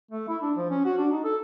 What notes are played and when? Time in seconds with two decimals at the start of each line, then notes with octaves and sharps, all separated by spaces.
0.11 A3
0.28 E4
0.42 D4
0.57 F3
0.70 C#4
0.85 F#4
0.98 D4
1.12 D#4
1.24 A4